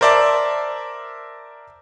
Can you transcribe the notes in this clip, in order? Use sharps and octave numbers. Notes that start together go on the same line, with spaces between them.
A#4 C5 D5 E5 A5